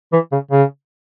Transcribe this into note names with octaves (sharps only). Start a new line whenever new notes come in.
E3
C#3
C#3